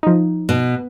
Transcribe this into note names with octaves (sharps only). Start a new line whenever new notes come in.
F3 D#4
B2